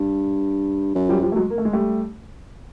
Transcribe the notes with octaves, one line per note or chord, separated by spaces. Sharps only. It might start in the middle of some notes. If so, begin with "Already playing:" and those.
Already playing: G2
F#2
F3 G3
F3 G3
A3
F#3 G#3
A#3
A3
G#3
G3 A3